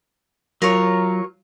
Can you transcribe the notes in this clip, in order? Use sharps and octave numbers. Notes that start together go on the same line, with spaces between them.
F#3 F4 A#4 C#5